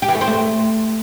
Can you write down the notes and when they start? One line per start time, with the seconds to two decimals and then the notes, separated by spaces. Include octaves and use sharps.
0.02 G4
0.09 E3
0.15 A3
0.21 C4
0.27 A3